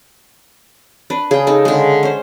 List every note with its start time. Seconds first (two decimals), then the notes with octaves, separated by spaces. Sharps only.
1.10 D4 B4
1.31 C#3 G#4 G5
1.47 D#4 A4
1.65 D3 G#3
2.03 C#4 C5